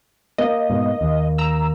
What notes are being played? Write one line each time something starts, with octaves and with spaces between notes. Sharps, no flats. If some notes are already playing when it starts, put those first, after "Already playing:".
A#3 D#5
G#2 B2
D#2
A#5 E6